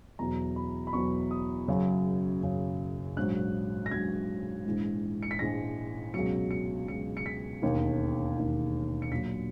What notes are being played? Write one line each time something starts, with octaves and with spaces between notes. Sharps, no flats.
E2 B2 F#3 A#5
B5
B5
E2 B2 F#3 C#6
D#6
F#1 F#2 C#3 F#3
F#1 F#2 C#3 F#3
A#1 G#2 F#3 F#6
A#6
A#1 G#2 F#3 G#6
A#1 G#2 E3 G#3
C#7
B6
A#1 G#2 E3 G#3 A#6
C#2 B2 F#3 C#7
C#7
C#2 B2 F#3 C#7
C#7
B6
E1 D#2 D#3
E1 D#2 D#3
C#7
A#1 A#2 F#3 B6